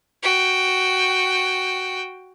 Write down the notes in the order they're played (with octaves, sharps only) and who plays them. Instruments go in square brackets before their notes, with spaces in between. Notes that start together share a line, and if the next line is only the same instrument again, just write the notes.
[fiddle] F#4 G5